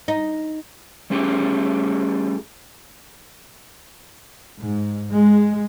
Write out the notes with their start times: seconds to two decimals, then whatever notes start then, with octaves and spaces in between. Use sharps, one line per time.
0.08 D#4
1.10 G3 A3 C#4 F4 G4 G#4
4.58 G#2
5.11 G#3